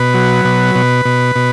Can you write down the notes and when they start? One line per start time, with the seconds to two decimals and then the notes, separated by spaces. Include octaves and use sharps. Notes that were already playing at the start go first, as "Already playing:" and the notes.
Already playing: B2 B4
0.14 F#3
0.45 B2
0.75 B2
1.05 B2
1.36 B2